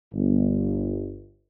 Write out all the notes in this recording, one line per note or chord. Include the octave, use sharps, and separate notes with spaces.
G1